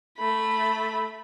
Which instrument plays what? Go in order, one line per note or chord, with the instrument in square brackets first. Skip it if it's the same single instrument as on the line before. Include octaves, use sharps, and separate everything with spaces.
[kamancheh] A3 B5